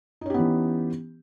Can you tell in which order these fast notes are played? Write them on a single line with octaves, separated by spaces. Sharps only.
D#4 C#4 G4 B3 E3